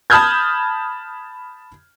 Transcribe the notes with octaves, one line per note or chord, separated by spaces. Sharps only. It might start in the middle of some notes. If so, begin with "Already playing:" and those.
A5 B5 D#6 F6 G6 G#6